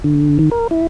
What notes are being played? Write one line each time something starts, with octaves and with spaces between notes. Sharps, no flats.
D3
D#3
A#4
E4